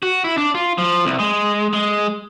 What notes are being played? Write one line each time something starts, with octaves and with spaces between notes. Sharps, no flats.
F#4
E4
D4
F4
F3
C2
G#3
G#3